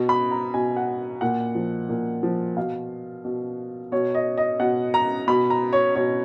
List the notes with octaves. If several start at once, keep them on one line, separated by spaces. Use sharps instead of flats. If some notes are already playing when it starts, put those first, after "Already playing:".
Already playing: B2
B5
A#5
B2 G#5
F#5
A#2 F#5
F3
A#2
F3
B2 F5
B2
B2 C#5
D#5
D#5
B2 F#5
A#5
B2 B5
A#5
C#5
B2 C#5